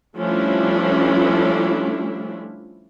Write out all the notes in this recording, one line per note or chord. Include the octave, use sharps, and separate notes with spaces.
F3 G3 A3 C#4 D4 E4